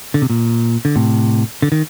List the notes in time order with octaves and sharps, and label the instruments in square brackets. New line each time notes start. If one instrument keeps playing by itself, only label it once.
[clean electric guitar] D3
C3
A#2
D3
A2 C3
D3
D#3